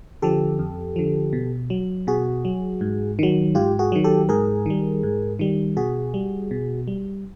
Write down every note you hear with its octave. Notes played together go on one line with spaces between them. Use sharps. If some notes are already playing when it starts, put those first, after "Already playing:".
D3 F3 G4 A4
F2
D3 F3
B2
F#3
B2 F#4 G#4
F#3
G#2
D#3 F#3
G#2 F4 G4
F#4 G#4
D#3 F#3
G4 A4
G#2 G#4 A#4
D#3 G3
G#2
D#3 G3
B2 F#4 G#4
G3
B2
G3